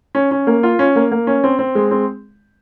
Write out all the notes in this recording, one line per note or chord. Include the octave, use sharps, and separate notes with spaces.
C#4
C#4
A#3
F4
C#4
A#3
A#3
C#4
C4
C4
G#3
C4